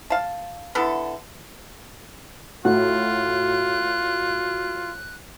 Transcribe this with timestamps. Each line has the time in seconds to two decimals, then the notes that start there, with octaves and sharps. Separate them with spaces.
0.10 F5 A5
0.75 D3 B3 E4 A4
2.65 A2 F4 F#4 F#6